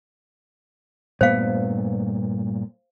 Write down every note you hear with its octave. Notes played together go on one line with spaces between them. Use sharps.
G2 A#2 A3 B3 C5 F5